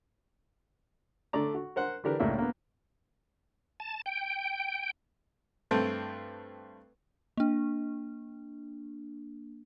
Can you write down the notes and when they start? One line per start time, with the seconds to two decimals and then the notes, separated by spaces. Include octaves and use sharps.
1.33 D3 A3 D5 A#5
1.54 F#4
1.76 A#4 C5 F#5
2.04 D3 E3 D4 G4 A#4 B4
2.20 C#2 A2 A#3 D4 E5
2.38 A#3 B3
3.80 A5
4.06 G5
5.71 G2 A3 C4
7.38 A#3 D4